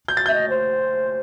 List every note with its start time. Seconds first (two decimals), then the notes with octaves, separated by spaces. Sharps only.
0.08 G6
0.17 A6
0.26 E5 G6
0.33 D#5
0.50 C5